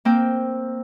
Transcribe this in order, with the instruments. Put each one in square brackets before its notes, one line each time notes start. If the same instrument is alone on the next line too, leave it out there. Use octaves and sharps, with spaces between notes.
[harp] A#3 C4 G5